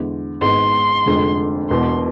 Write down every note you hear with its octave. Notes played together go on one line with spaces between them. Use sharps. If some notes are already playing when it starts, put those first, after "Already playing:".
Already playing: E2 D3 G#3
G#1 G#2 G#3 B3 C6
F1 F2 D3 G#3
E1 E2 B2 C6